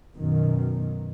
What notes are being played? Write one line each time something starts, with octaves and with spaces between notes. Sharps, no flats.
F#2 B2 D#3